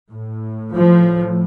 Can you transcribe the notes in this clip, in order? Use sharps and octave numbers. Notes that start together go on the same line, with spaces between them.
A2
F3